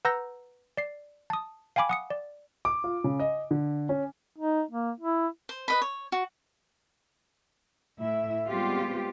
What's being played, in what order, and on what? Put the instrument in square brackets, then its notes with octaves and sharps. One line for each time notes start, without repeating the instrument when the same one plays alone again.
[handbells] B4 F#5 A#5 E6 G6 A#6
D5 C7
A5 D#6
F5 G5 G#5 B5 D6
F#5 D#6 C#7
D5
[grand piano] D6
F4
C#3
D#5
D3
C#4
[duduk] D#4
A#3
E4
[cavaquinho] C5
B4 D#5 B5
C#5
F#4
[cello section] A2 E4 E5
G3 G#3 B3 C4 F4 G4